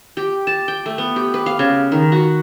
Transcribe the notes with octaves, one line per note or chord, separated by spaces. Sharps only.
G4
A5
G5
A3
B3
G4
B4
F5
C#3
D#3
F#4